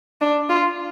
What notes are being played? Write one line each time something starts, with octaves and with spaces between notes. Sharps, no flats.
D4
F4